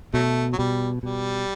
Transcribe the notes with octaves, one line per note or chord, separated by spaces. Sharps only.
B2 F#3 A3
F#3
B2 G3
B2 G3